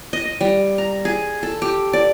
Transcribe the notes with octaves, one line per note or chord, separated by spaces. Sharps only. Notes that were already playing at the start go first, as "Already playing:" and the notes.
D#5
D#5
G3
A#5
G#4
A4
G4
D5